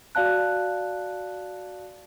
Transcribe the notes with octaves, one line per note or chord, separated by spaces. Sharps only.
F#4 D5 F5 A5 F#6